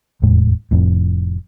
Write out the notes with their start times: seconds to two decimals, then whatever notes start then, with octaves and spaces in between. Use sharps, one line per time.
0.22 F1 E2 A2 G#3
0.71 F1 F2 A2